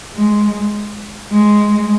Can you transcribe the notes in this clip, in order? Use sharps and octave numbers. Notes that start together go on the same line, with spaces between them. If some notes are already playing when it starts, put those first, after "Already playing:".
G#3
G#3